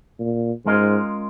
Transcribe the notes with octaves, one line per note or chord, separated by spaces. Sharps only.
A#2
G#2 G#3 C#4 F4 A#4 D#5